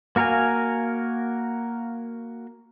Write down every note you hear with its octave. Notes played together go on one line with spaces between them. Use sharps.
A#3 F#4 A#4 F5 G#5